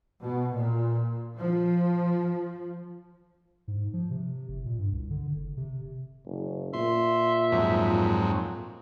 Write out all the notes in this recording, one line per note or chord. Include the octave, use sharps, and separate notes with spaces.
B2
A#2
F3
G#2
F3
C3
F#1
A#2
G2
C2
D3
F#1
C3
F#1
A#2 E5 C6
F2 G#2 F#3